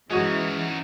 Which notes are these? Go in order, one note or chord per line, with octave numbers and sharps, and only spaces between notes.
E3 G#3 C#4 D#4 F#4 C#6